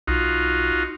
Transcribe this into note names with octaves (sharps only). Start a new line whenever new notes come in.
B1 D#4 F4 F#4